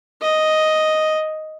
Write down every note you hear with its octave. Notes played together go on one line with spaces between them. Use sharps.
D#5